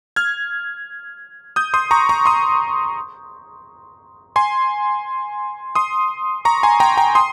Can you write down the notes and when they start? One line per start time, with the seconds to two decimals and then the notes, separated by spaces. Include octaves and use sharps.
0.16 F6 G#6
1.56 D#6 G6
1.74 C6 D#6
1.91 A#5 C#6
2.09 A#5 C#6
2.26 C6 D#6
4.36 G#5 C6
5.75 C6 D#6
6.45 A#5 C#6
6.63 G#5 C6
6.80 G5 A#5
6.97 G5 A#5
7.15 C6 D#6